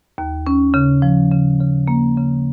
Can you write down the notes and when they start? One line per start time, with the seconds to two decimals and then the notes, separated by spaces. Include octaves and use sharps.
0.18 D#2
0.47 C#4
0.74 C#3
1.02 F3
1.32 C#3
1.60 C#3
1.88 A#3
2.17 C#3